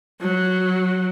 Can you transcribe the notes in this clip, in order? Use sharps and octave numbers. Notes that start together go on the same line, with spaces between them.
F#3